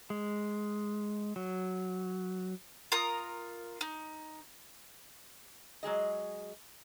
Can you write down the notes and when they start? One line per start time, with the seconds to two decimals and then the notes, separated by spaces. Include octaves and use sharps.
0.10 G#3
1.36 F#3
2.92 F4 A#4 A#5 D#6
3.81 D#4
5.83 F#3 G#3 G#4 D#5